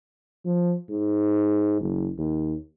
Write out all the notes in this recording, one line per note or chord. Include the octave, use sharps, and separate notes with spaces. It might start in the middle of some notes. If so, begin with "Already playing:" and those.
F3
G#2
F#1
D#2